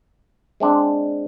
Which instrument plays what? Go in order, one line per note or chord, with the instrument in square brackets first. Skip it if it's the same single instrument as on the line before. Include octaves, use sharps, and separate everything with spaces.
[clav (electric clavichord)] G#3 C4 D4